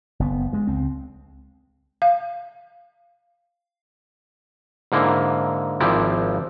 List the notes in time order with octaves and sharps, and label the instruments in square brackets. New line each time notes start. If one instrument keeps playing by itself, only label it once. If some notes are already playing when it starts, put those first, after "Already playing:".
[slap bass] F#1 B3
G2 G#3
C#2 C4
[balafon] F5
[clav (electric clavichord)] G#2 D3 A#3 E4
G#1 F3 A#3 E4 D5 G5